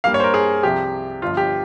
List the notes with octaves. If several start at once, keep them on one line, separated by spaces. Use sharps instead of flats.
G2 G3 A#3 F5
C#5
C5
A#4
G#4
C2 C3 F3 G4
G1 G2 F3 F4
G4